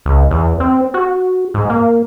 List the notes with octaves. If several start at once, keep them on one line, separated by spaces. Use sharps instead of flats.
C#2
E2
C4
F#4
G#2
A#3